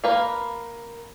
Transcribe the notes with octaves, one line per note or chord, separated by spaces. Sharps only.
A#3 B4 F5